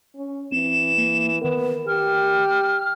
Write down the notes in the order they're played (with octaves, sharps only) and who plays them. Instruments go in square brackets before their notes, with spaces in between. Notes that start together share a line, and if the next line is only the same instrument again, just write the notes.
[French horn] C#4
[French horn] E3 [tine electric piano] C4 [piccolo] E7
[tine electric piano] A#3
[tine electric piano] D#3 A#4 [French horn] B3
[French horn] G4 [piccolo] F6